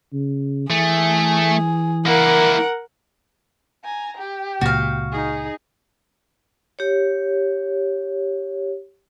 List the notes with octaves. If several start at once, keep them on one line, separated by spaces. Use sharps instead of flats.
C#3
E3 A3 G#4
A#3 E4 A#4 F#5
G#5 A#5
G4
C#2 A#2 F#4 F5
D#4 G#4
G4 C#5